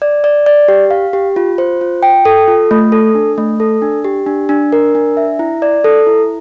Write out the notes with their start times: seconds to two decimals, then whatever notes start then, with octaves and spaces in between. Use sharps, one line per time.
0.02 D5
0.24 D5
0.46 D5
0.68 G4
0.91 F5
1.13 G4
1.36 F4
1.58 C5
1.81 F4
2.03 G5
2.25 A4
2.48 F4
2.71 A3
2.92 A4
3.15 D4
3.38 A3
3.60 A4
3.82 D4
4.04 G4
4.26 D4
4.49 D4
4.72 A#4
4.95 D4
5.17 E5
5.39 E4
5.62 D5
5.84 A4
6.07 E4